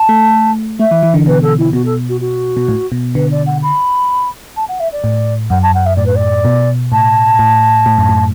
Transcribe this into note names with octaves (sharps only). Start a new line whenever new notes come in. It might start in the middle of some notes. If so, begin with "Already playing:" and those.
Already playing: A5
A3
A3 E5
E3
E3
D3
B2 B4
A4
E4
B2 F#4
A4
F#4
F#4
B2
A2
B2
D3 B4
D5
F#5
B5
A5
F#5
E5
D5
A2
F#2 F#5
A5
F#5
E5
A2 D5
B4
D5
B2
A2 A5
A2
A2
F#2
A2